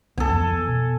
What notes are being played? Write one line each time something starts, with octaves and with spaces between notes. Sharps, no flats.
C#2 C#3 B3 A4 G#5
F2 E3 B3
B2